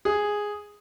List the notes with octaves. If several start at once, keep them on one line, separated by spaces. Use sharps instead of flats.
G#4